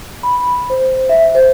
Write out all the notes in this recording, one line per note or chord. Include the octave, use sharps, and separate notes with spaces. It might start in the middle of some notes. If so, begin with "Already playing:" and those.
B5
C5
E5
C5